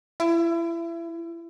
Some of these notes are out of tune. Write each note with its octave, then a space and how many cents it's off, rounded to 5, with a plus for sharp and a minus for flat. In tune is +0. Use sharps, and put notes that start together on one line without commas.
E4 +30